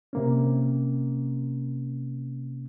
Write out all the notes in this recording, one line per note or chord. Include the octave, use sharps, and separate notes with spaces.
C3 A#3 C#4